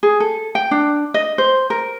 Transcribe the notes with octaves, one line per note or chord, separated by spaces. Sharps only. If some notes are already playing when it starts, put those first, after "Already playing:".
G#4
A4
G5
D4
D#5
C5
A#4